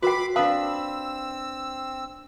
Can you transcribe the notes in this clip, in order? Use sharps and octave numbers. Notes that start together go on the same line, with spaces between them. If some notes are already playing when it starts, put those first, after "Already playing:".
F#4 A#4 B4 G5 B5 D6 C7
C4 D4 B4 F5 A5 D#6 E6